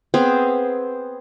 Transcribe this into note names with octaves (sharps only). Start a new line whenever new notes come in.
B3 C4 G#4 F5